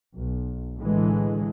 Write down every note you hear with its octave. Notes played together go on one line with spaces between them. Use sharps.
B1
A2 D3 E3 G#3